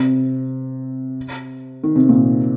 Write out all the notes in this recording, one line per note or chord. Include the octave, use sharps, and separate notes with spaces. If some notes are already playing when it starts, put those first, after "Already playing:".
Already playing: C3
D#3
C3
A#2 D#3